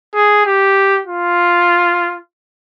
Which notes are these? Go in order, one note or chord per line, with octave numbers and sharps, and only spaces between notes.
G#4
G4
F4